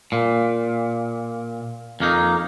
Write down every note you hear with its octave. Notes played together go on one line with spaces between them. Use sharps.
A#2
F2 A#3 D#4